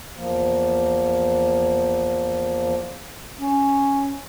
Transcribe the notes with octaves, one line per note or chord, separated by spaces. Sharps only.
E2 F3 A#3
C#4